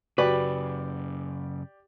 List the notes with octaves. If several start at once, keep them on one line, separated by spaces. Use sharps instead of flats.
F#2 C#3 F#4 G4 B4 D5